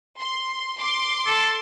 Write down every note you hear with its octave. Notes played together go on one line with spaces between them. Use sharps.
C6
C6 D6
A4